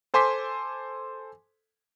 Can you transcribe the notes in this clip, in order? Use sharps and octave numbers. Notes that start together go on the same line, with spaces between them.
A4 C5 G#5 C6 D6 B6